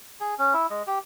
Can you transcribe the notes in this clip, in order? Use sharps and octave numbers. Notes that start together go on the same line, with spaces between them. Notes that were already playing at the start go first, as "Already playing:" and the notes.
G#4
C#4
E4
G#3
G4